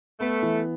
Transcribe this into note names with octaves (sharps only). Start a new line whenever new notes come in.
A3 B3
E3